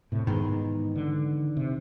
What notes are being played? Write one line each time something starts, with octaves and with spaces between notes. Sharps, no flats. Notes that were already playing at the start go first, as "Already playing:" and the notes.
A2 C3
G#2 B2 D#3 E3 G#3
D3
C3